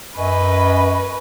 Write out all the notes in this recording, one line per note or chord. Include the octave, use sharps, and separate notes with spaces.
F#2 B4 D#5 G#5 C#6